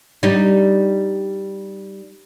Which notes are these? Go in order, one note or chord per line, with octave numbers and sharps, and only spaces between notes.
G3 D#4